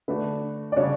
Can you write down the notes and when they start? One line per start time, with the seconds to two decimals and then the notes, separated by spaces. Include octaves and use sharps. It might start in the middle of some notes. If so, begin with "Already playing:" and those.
0.08 D3 A3 D4 F#4 B4
0.72 D5
0.76 C#3 G3 D4 F#4 C#5